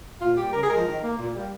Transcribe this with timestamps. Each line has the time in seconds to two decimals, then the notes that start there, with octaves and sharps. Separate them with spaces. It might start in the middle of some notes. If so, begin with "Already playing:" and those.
0.22 A#2 F4
0.37 G3 G4
0.43 A#3
0.53 C#3 A#4
0.62 G#4
0.70 F3 G#3 A#4
0.86 D#3
1.03 A#3
1.17 A#2
1.34 G3 A#3